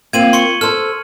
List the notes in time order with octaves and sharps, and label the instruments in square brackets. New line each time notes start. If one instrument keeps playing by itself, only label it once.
[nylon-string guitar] A#3 C4 F4 [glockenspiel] G#6 D#7 F#7
[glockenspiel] C6 C#6 C#7
[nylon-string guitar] A4 C5 [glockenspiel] F6